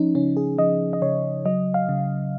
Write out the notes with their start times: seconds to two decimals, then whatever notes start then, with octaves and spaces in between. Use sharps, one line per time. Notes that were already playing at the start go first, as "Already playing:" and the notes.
Already playing: F3 C#4 D#4
0.15 C#3 C#4
0.37 G#4
0.58 F3 D#5
0.93 D#5
1.02 C#3 C#5
1.45 F#3 D#5
1.74 F5
1.89 C#3